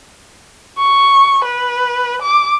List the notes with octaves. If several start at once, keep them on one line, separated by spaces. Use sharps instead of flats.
C#6
B4
D6